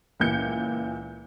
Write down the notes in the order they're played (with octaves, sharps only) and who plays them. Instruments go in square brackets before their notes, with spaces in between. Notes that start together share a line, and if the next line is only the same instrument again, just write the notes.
[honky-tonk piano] C#2 A#2 E3 G6 C#7